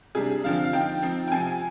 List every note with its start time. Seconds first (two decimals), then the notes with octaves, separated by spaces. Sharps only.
0.15 C3 G3 D4 G#4
0.44 D3 F3 C4 F5
0.65 F5
0.73 F3 C4 D#4 G5
1.02 F3 C4 D#4
1.28 G5
1.32 C3 F3 C4 G#5